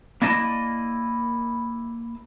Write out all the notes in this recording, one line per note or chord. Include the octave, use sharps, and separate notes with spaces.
A#3 E4 D5 D#5 A5